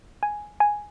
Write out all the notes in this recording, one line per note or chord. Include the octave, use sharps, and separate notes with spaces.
G#5
G#5